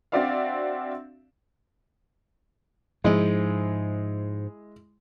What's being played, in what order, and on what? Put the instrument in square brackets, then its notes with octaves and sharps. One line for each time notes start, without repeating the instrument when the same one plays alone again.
[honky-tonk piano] C4 D4 F#4 D5 E5 F5
[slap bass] G#2 F3 [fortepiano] G#3 E4